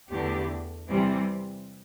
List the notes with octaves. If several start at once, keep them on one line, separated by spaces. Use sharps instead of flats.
E2 D3 A3 D4 G4
C3 E3 G3 C4